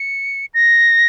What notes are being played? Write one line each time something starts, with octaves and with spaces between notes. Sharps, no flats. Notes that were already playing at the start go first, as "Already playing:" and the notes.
Already playing: C#7
A#6